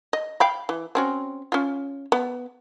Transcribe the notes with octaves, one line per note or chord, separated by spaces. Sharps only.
D#5
F5 G5 B5
E3
C4 C#4 F#4
C#4 F4
B3